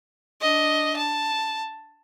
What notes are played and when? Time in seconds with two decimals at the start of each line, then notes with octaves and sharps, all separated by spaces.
0.41 D4 D#5
0.96 A5